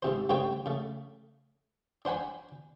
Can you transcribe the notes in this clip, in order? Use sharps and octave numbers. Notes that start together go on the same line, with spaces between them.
G#2 C3 C5
G2 C#3 A3 C5 C#5 G5
C#3 A3
D4 C5 F#5 G#5 B5